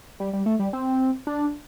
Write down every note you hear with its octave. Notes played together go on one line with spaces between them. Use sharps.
G3
G3
A3
G3
C4
D4